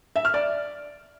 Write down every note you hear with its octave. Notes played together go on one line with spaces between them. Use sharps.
E5
F6
D5